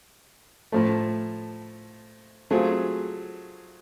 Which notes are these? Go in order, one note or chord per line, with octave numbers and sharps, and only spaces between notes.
A2 F3 A3
F#3 A3 C4 F4 G#4